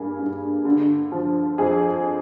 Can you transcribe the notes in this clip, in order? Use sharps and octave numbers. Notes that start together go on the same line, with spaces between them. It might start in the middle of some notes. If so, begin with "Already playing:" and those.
Already playing: G2 G3 A#3 G#4
G2
D3
F3
F2 G#4